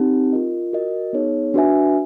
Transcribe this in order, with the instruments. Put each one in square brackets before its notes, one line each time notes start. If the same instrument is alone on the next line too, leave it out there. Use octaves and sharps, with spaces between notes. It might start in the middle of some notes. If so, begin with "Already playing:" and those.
Already playing: [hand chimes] C4 D#4 G4
F4 A#4 D#5
F#4 A#4 D#5
B3 D#4 G#4 C#5
D4 F#4 B4 E5 G#5